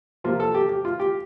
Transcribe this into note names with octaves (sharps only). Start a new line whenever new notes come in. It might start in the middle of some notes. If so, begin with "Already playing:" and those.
C3 F3 A#3 F4
A4
G4
G4
F4
G4